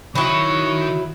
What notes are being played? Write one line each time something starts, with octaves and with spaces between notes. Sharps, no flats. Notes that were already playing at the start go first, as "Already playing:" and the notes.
D#3 F#3 E4 D#5 C#6